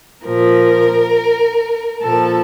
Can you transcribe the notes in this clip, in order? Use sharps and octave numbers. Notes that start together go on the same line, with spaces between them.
A#2 F3 A#4
A#2 F3 A4